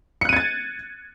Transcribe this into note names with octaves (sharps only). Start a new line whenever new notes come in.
F#6 G#6 A6 C#7 D#7